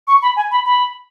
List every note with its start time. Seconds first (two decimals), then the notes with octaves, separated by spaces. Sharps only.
0.08 C#6
0.22 B5
0.36 G#5
0.51 B5
0.66 B5